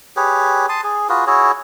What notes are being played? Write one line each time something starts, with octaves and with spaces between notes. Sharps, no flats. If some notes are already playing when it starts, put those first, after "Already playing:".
G4 G#4 B4 C#5
A5 C6 D#6
G#4
F4 F#4 G#4 B4
E4 F#4 G#4 C#5